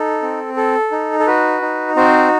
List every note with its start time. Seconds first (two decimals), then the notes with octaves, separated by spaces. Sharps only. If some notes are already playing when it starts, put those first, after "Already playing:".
Already playing: D#4 A4
0.22 C4
0.56 A4
0.91 D#4
1.19 A4
1.27 F#4 B4
1.62 D#4
1.96 C4 F#4 C5